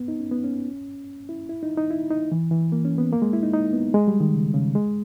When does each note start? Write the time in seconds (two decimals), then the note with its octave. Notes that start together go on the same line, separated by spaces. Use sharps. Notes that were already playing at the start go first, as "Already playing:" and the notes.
Already playing: B3
0.08 D#4
0.19 C#4
0.31 B3
0.44 C#4
1.29 E4
1.49 E4
1.63 D#4
1.78 D#4
1.90 E4
2.10 D#4
2.32 E3
2.51 E3
2.72 A#3
2.85 C#4
2.98 B3
3.13 A#3
3.22 G#3
3.33 E4
3.43 D#4
3.53 D#4
3.73 B3
3.94 G#3
4.08 G3
4.20 D#3
4.35 C#3
4.54 C#3
4.75 G#3